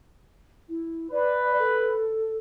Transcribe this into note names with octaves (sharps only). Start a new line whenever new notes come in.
E4
B4 D5
A4